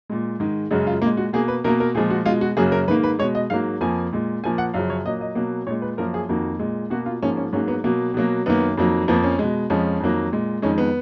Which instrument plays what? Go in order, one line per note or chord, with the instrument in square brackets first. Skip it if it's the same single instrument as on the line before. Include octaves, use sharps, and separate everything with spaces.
[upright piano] A#2 G#3
G#2 D#3 G#3
F#2 C#3 G#3 F#4
F4
A#2 G#3 A#3
F#4
B2 A#3 G#4
B4
B2 A#4
A#3
A#4
A#2 F3 G#3 G#4
F#4
B2 G#3 F4
F#4
F#2 C#3 F#3 A#3 G#4
A#4
G#2 D#3 A#3 B4
B4
B2 G#3 C#5
D#5
G#2 F#3 A#3 F5
F2 F3 A#3 G#5
A#2 G#3
A#2 F3 A#3 G#5
F#5
F#2 C#3 F3 F5
C#5
A#2 F#3 A#3 D#5
D#5
B2 F#3 A#3
A#2 G#3 C#5
B4
F#2 F3 A#3 A#4
G#4
F2 D#3 A#3 F#4
A#2 G#3
B2 A#3 F#4
F4
G#2 F3 A#3 C#4
C#4
G#2 F#3 A#3 C#4
B3
B2 F#3 A#3
B2 F#3 A#3
F#2 D#3 A#3 B3
F2 D#3 F#3 A#3
F2 F3 A#3 B3
C#4
B2 G#3
F2 F3 G#3 C#4
F2 D#3 F#3 A#3
A#2 G#3
F2 D#3 G#3 C#4
B3